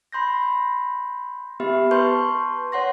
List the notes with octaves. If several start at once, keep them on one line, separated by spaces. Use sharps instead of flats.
B5 C6 G6 A#6
B3 G4 E5 B5
B4 A5 C6 C#6 G6
C#5 F#5 C6 A#6